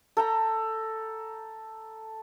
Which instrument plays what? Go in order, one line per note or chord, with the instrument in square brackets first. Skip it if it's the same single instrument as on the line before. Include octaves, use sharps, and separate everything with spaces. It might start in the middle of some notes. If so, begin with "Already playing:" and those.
[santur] A4 G5 A#5